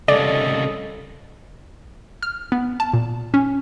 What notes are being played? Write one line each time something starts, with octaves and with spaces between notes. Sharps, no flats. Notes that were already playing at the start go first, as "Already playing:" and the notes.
C2 C#3 A4 D5 D#5
F6
B3
A5
A#2
C#4